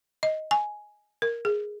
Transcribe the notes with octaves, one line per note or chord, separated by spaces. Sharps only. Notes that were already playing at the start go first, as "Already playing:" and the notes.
D#5
G#5
A#4
G#4